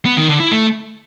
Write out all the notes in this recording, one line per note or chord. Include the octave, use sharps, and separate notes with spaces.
B3
D#3
D3
E4
A3